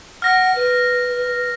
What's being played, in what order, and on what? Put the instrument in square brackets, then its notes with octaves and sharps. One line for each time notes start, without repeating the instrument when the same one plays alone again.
[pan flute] F#5 [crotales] F6 A#6
[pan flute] B4